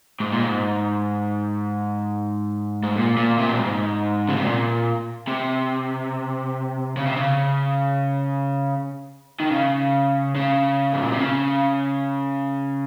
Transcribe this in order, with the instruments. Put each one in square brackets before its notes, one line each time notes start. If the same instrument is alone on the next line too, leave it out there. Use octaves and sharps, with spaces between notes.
[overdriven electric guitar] G#2
A#2
G#2
G#2
A#2
A#2
C3
A#2
G#2
C#3
C3
A#2
C3
C#3
C3
C#3
D#3
C#3
C#3
G#2
A#2
C3
C#3